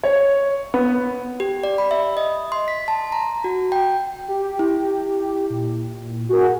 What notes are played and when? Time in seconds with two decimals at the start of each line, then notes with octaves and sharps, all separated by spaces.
0.04 C#5
0.74 B3
1.40 G4
1.63 D5
1.78 B5
1.91 E5
2.17 D#5
2.52 C6
2.68 B6
2.88 A5
3.12 A#5
3.44 F#4
3.72 G5
4.28 G4
4.59 E4
5.50 A#2
6.29 F#4 G#4 A#4